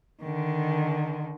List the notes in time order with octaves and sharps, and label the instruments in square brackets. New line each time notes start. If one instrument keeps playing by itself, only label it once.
[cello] D3 D#3